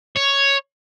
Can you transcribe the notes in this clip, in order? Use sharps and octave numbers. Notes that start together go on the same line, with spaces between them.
C#5